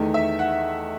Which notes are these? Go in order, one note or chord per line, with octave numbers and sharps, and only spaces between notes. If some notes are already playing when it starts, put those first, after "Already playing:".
Already playing: E2 D#3 A3
E5
F#5